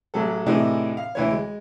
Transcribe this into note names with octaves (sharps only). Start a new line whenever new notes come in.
A1 F#3 G#4 A4
A2 C3 E3 D4 D#4 G#4
F5
D2 E3 C#5
G#3